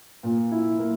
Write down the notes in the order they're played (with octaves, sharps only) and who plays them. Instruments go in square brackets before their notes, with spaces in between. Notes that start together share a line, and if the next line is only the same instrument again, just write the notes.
[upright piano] A#2
E4
A#3